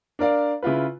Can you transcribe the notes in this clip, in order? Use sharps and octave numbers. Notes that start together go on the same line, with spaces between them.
D4 A#4 D5 F5
C#3 E4 F4 B4